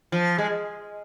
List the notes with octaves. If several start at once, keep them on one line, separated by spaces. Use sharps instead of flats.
F3
G#3